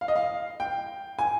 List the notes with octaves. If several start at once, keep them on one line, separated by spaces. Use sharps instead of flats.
F5
D#5
F5
G5
G#5